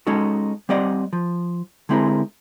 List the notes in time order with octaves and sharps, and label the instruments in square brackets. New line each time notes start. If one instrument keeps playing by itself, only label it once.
[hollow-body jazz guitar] G#3 C#4 D#4 F#4 A4
G3 C4 G4 D5 D#5 F#5
F3
D3 G#3 C4 E4 G#4 A#4